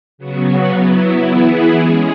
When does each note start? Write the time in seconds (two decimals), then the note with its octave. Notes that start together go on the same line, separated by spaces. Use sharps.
0.18 C#3 F#3 B3 F#4
0.72 F#3 B3 E4
1.26 E3 B3 E4 G#4
1.80 G#3 C#4 G#4